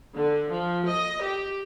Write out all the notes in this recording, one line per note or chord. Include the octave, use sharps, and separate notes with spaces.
D3
F3
D#5
G4